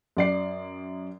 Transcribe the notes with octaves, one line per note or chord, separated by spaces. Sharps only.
F#2 D5 C7